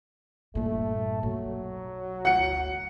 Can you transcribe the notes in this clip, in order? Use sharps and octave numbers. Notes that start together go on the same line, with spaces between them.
G2 A#2 A3
B1 F#3
G1 D2 F#5 C#7